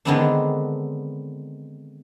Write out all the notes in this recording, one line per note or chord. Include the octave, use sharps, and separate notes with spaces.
D3 D#3 G#3 B3 C4 D4